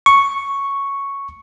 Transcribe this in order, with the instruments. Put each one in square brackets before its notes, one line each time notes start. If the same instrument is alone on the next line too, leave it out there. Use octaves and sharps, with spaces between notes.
[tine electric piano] C#6